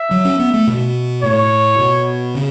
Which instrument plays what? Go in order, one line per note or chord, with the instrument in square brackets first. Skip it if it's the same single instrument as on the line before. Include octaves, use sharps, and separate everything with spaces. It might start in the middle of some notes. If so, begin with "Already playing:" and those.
Already playing: [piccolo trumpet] E5
[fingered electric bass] F#3
C#4
B3
A3
B2
[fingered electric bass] A2 [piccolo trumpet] C#5
[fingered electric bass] B2
C#3